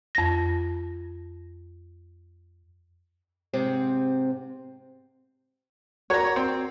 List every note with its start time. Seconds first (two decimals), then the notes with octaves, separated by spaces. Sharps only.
0.15 F2 A#6
3.53 G#2 C3 C4
6.10 F#4 A#4 C#5 D5 A#5
6.36 C4